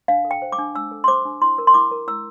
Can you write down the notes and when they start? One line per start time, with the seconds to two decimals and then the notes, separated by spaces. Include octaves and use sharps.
0.08 D4 F5
0.25 A4
0.31 G5
0.42 C5
0.52 D6
0.58 D4
0.75 D4 E6
0.91 A4
1.04 C6
1.08 C5 D6
1.25 D4
1.42 E4 C6
1.58 A#4
1.67 C6
1.74 E4 D6
1.91 A#4
2.08 E4 E6